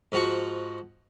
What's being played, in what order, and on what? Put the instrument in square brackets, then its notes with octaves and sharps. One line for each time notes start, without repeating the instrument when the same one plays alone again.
[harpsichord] G#2 F3 F#4 C#6